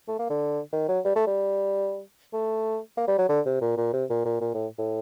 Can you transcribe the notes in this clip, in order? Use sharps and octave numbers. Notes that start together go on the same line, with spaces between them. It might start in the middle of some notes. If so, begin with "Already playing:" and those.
A3
A#3
D3
D#3
F#3
G3
A3
G3
A3
A#3
G3
F#3
D3
C3
A#2
A#2
C3
A#2
A#2
A#2
A2
A2